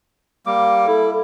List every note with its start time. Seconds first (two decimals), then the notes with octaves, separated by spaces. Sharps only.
0.46 G3 A#3 D6
0.87 E4 A4